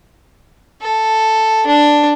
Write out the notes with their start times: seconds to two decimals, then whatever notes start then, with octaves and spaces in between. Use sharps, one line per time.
0.81 A4
1.67 D4